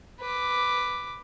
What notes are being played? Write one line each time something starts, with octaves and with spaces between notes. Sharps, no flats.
B4 D6